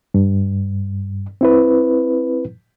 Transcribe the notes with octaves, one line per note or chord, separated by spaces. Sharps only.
G2
C4 E4 B4